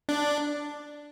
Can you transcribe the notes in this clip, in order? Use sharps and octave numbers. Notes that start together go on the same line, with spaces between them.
D4